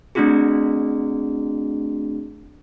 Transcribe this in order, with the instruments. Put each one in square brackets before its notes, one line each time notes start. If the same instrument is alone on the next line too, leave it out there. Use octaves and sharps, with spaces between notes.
[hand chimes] A3 C4 D4 E4 F#4 G#4